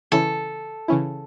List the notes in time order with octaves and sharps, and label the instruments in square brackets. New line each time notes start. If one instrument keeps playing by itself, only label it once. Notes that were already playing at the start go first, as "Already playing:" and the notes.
[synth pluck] C#3 E3 C#4 E4 [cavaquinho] A4
[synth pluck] C#3 E3 C#4 E4